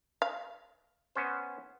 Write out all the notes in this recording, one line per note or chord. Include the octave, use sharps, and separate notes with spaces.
F5
B3 C#4 C5